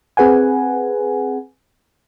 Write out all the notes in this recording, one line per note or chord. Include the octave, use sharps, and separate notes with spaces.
C4 G#4 B4 F#5 G#5